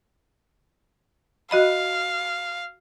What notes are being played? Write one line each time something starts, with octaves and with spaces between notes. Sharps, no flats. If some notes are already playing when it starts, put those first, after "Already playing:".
F#4 D#5 F5 B5